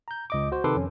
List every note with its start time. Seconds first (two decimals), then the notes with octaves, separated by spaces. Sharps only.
0.08 A#5 G6
0.30 C#2 D#5 D6
0.52 F#4 C5
0.64 C3 D#3 A4 B4 C6 D6
0.76 F2 C#4